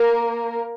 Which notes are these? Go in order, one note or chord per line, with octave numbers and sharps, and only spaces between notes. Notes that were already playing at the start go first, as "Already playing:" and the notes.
Already playing: A#3 A#4